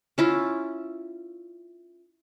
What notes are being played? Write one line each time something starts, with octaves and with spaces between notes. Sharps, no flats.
C#4 E4 F4